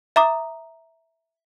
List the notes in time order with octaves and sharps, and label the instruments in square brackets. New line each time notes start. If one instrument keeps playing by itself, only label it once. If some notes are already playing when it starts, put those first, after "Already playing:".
[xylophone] E5 A#5 D6 D#6